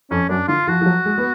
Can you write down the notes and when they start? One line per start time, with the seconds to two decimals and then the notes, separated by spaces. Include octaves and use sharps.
0.11 F2 C#4
0.29 F#2 D4
0.48 D3 F4
0.68 F3 F#4
0.81 F3
0.86 F#3
1.06 G#3
1.18 B3